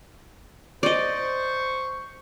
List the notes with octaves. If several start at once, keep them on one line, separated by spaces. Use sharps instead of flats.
C5 D5 D#5 C#6